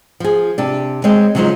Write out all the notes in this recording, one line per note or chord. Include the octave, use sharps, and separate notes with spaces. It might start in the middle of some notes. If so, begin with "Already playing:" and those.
F3 G#4
C3 D4
G#3 C4 C#5 D#5
C#3 F3 F#3 G#3 D#4 C5